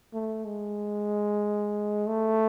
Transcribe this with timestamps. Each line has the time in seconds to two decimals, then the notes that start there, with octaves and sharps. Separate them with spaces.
0.13 A3
0.45 G#3
2.07 A3